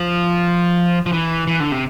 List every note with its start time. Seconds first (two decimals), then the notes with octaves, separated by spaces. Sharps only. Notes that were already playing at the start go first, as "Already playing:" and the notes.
Already playing: F3
1.06 F3
1.13 E3
1.47 E3
1.60 D3
1.72 C3